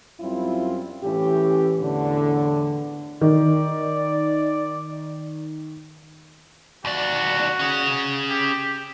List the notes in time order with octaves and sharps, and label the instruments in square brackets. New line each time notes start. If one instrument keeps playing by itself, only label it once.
[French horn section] F#2 G3 C4 E4 F4
A2 E3 C#4 G4
E2 A2 D3
[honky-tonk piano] D#3 [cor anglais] D5
[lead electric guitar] D#2 D5 [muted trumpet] F#4
[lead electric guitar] C#4 G#4
[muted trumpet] G4